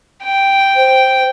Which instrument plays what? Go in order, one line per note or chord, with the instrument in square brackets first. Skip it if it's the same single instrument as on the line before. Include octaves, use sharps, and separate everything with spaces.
[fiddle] G5
[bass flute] C5